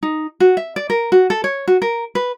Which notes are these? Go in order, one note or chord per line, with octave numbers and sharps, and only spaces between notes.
D#4
F#4
E5
D5
A#4
F#4
A4
C#5
F#4
A#4
B4